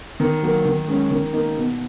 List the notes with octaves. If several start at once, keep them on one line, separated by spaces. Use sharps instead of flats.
D#3
F#3 A#3
D#3
G#3 C#4
D#3
A#3 D#4
B2